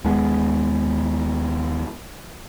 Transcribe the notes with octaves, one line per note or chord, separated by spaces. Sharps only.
D#2 G#3 B3